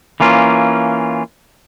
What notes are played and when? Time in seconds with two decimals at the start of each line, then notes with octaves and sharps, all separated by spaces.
0.20 E3 A#3 C#4 F4